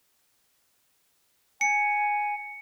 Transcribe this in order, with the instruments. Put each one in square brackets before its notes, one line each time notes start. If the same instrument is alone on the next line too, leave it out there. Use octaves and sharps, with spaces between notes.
[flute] G#5 [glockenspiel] C#7